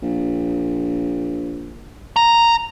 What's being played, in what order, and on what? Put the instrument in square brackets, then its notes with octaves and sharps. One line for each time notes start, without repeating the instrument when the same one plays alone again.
[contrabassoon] A#1
[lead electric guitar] A#5